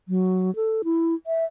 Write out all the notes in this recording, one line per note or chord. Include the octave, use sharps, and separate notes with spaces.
F#3
A4
E4
E5